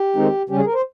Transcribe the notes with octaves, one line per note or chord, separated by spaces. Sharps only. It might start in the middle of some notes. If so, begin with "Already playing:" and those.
Already playing: G4
D#3 G#3 C4 D#4
C#3 G3 C#4 G4
G#4
A#4
C5